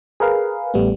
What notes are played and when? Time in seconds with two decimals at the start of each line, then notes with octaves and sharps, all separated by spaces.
0.20 G#4 A#4 B4 F5
0.74 A1 G3 A3 B3